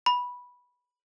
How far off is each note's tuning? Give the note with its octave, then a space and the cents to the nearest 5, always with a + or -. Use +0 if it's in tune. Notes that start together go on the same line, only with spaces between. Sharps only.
B5 -10